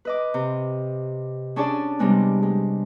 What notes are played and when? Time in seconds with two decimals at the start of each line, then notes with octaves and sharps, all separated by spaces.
0.05 B4 D#5 D6
0.34 C3
1.56 C#4 D4 G#4 C#5 D5 A5
1.99 C3 G3 G#3 B3
2.43 G#3